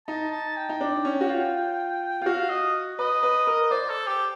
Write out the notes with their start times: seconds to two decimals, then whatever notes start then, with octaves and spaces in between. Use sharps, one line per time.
0.08 D#4 A5
0.32 A5
0.57 G5
0.69 D#4
0.81 D4
1.05 C#4
1.21 F#4
1.29 F4
2.21 F4
2.26 F#4 F5
2.50 D#5
2.99 B4 D#5
3.23 B4
3.47 A#4
3.71 C5 D5
3.90 A4
4.07 G4